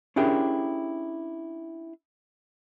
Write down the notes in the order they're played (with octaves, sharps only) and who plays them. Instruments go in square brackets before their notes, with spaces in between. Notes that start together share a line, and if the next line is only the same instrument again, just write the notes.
[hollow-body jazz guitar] C#4 D4 E4 G4 G#4 A#4